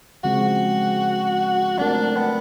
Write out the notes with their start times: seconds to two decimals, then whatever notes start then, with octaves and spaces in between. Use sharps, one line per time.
0.23 C#3 F3 G#3 C4 F#4
1.78 F#3 A3 C4 D4 F4 A#4
2.16 B3